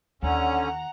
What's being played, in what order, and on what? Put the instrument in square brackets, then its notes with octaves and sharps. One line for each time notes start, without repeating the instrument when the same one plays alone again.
[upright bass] D#2 [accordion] D3 C#4 [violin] F#5 A#5